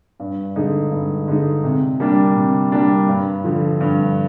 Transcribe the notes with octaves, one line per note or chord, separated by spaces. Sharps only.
G2
D3 G#3 D#4
G2
D3 G#3 D#4
C3
G3 A#3 D4
C3
G3 A#3 D4
G2
D3 F3
G2